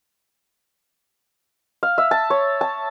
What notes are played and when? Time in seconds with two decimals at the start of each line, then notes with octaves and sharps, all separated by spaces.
1.83 F5
1.98 E5
2.11 A5
2.30 C#5
2.61 A5